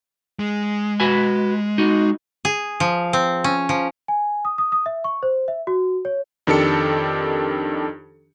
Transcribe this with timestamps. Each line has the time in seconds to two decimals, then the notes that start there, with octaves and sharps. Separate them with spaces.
0.39 G#3
1.00 F#4 B4 G#5
1.78 D#4 F#4
2.45 G#4
2.80 F3
3.13 C4
3.44 C#4
3.69 F3
4.08 G#5
4.45 D#6
4.58 D#6
4.72 D#6
4.86 E5
5.04 C#6
5.23 C5
5.48 E5
5.67 F#4
6.05 C#5
6.47 F2 D#3 D4 G4 A4 C#7